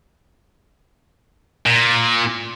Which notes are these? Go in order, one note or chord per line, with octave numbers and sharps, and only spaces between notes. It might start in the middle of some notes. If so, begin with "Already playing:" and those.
A#2